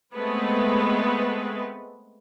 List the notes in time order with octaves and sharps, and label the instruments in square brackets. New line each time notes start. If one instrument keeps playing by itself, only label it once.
[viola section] G#3 A3 B3 C4 B4